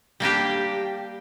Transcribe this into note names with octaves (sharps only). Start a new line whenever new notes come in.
G3 A#3 D4 G4